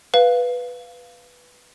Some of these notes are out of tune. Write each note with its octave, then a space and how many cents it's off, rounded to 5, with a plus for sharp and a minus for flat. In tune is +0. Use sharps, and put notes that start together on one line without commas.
B4 +0 F5 +0